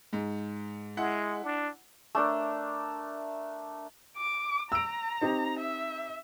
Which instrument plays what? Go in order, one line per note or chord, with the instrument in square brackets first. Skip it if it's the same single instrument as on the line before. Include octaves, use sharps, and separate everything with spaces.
[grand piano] G#2
[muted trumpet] G#3 [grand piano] E4 F#5
[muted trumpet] D4
[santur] A3 D4 A#4
[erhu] D6
[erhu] A#5 [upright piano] E6 D7
[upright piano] C4 D#4 G4
[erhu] E5